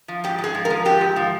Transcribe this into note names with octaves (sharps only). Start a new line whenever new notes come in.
F3
G#2 G4
G#2
G#4
F3
A#4
F3
G#2 G4
G#2
F3